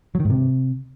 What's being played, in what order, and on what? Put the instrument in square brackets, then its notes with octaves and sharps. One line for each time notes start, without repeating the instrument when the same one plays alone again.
[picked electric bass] F#3
D#3
G#2
C3